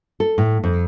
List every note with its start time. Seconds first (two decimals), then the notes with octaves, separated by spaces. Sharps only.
0.20 A4
0.38 A2
0.64 F2